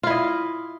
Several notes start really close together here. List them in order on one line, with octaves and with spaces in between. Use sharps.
F4 E4 D#5